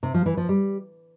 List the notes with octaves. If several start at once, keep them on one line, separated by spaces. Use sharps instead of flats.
C3
F3
E3
F3
G3